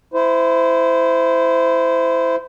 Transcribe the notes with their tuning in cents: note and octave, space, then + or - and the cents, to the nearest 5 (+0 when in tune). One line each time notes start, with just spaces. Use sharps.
E4 +0 C5 -20